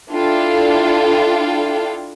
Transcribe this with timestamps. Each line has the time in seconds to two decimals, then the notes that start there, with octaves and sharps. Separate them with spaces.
0.12 D4 E4 F4 A4 F5 G5